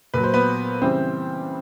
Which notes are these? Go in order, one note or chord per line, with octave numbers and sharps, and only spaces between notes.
A#2 F#3 B4
C5
B3 B4
C#3 E3 G3 C4 C5